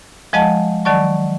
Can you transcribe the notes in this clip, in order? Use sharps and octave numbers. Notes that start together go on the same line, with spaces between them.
F3 G#3 D#5 F#5 A5
D#3 F#3 D5 A5 C#6